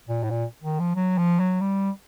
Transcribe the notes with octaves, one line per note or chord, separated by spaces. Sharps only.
A#2
A2
A#2
D#3
F3
F#3
F3
F#3
G3